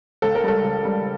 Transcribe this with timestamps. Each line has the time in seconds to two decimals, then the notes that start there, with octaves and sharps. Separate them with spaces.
0.22 C#2 A4
0.35 A#4
0.44 G3 A4
0.64 C#2
0.85 G3